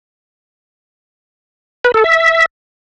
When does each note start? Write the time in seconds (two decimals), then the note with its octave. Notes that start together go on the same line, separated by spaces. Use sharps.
1.84 B4
1.94 A4
2.04 E5